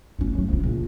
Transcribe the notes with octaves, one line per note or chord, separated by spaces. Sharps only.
A3 C#4
F#3 A3
F3 D4
A#1